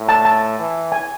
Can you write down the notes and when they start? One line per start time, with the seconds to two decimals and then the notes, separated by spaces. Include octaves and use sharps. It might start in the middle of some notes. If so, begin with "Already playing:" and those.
Already playing: A2
0.09 A5
0.25 A5
0.59 E3
0.92 G#5